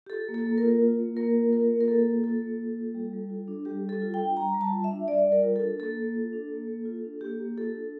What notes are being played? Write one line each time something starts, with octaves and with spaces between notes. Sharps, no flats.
G4
F4 A4
A#3
A4
A#3
A#4
F4
F4
A#3
A#3 A#4
F4
F4 A#4
A#3
A#4
A#3 A4
F4
F4 A4
A#3
A#3
F4
G3
G3
F4
D4
G3 G4
G3
A4
F4
G5
D4
G3 A#5
G3
A5
F4
E5
D4
G3 D5
G3
A#4
F4
A4
D4
A#3 A4
A#3
F4
D4
A#3
A#3
F4
D4
A#3 G4
A#3
F4 A4
D4